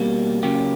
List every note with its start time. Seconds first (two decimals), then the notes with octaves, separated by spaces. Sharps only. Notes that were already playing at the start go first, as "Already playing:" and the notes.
Already playing: B2 G3 A#3
0.43 C#3 F#3 A#3 G4